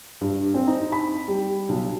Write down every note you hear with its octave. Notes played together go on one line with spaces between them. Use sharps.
G2
C4
D#4
B5
G3
B1